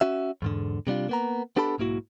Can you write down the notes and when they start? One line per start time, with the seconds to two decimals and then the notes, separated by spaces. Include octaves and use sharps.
0.01 C#4 F#4 E5
0.42 E2 G#2 D3
0.87 C3 G3 D4 F4
1.09 A#3 B3 A#5
1.56 B3 D4 G4 A4 A5 B5
1.78 B1 G#2 A#3 E4 F#4